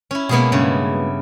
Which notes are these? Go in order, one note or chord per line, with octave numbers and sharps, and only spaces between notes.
C#4 E4
B2 G#3 A#3 B3 E4 G#4
G2 C#3 E4